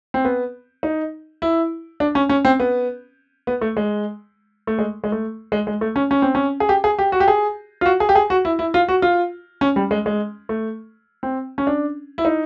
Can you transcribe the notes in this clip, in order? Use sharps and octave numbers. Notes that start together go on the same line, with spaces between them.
C4
B3
D#4
E4
D4
C#4
C#4
C4
B3
B3
A3
G#3
A3
G#3
G#3
A3
G#3
G#3
A3
C#4
C#4
C4
C#4
G#4
G4
G#4
G4
F#4
G4
G#4
F4
F#4
G#4
G4
G#4
F#4
E4
E4
F4
F#4
F4
C#4
G3
G#3
G#3
A3
C4
C#4
D4
E4
D#4